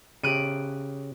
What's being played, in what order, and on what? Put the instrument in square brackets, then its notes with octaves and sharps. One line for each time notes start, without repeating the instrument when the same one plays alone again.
[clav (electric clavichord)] C#3 G4 [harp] F#6 D7 D#7